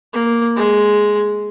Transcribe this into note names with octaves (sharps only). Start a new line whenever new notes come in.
A#3
G#3